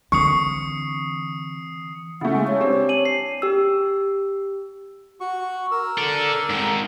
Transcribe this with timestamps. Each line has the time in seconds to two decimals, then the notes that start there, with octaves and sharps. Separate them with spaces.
0.12 D3 E3 C4 C#6 D#6 C7 C#7
2.21 C#3 A3 E4 F#5
2.35 G#3 G#5
2.48 C#5
2.61 C4 D4 G4
2.89 G#5 D#7 F#7
3.05 C7
3.42 G4 E6
5.20 F#4 C#6
5.71 A#4 E6
5.98 A4 D5
6.50 G#2 D#3